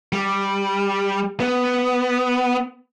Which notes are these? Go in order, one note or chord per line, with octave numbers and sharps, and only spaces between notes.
G3
B3